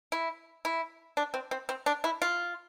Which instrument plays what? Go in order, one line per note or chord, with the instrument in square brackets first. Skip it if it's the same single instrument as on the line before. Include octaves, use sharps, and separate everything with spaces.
[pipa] E4
E4
D4
C4
C4
C4
D4
E4
F4